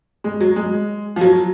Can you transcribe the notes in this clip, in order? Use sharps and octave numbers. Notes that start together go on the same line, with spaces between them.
G#3
F#3
G#3
F3
F#3